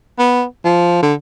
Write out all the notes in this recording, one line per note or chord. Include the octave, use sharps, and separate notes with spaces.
B3
F3
D3